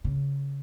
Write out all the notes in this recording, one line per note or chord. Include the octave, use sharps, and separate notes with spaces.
C#3